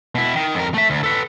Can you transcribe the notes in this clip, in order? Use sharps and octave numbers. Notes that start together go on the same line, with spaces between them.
B2 E4
D#3
F2 A#4
A3 E5
D2
A4 B4